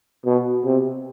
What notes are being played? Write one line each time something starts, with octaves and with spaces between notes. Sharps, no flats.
B2
C3